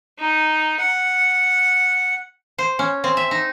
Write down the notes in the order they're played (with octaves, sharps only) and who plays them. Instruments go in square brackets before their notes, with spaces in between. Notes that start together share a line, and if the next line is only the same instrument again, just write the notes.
[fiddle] D#4
F#5
[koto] C5
C#4
C4
E5
D#4